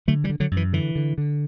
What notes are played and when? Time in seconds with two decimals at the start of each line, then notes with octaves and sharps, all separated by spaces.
0.08 D3 F#3 A3
0.24 E3 G3
0.29 D3
0.40 D3 F#3
0.51 F#2
0.57 E3
0.73 D3 E3
0.96 D3
1.18 D3